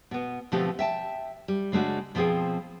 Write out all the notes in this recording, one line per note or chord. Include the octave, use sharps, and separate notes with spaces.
B2 B3
B2 D3 F3 A3 C4 G4
E5 G5 A5
G3
C#3 G#3 A3 D4 F#4
B2 F3 C4 G#4 G5